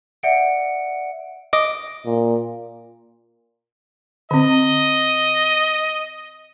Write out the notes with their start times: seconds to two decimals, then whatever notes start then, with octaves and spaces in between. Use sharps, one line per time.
0.23 D5 E5 F#5 C#7 D7
1.53 D#5 D6
2.06 A#2
4.31 D3 C4 D#5